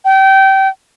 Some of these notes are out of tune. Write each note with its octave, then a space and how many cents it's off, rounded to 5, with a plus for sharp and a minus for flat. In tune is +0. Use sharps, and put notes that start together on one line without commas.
G5 -25